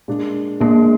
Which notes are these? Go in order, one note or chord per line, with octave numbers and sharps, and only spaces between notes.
A#2 G#3 D4
A#2 G#3 A#3 D4